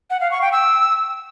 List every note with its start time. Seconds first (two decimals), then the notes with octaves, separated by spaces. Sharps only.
0.10 F#5
0.21 F5
0.31 C#6
0.42 G5
0.52 E6